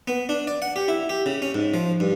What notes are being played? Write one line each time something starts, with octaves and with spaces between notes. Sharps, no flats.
B3
D4
D5
F#5
G4
E4
G4
C#3
C#4
G#2
F3
G2